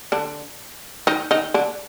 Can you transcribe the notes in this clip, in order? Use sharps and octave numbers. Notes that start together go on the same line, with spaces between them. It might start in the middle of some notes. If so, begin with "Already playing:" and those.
D3 D4
D#3 D#4
D#3 D#4
D3 D4